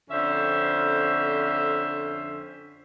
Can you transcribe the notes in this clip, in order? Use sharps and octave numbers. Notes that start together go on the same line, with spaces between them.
F2 D3 C#4 C5 E5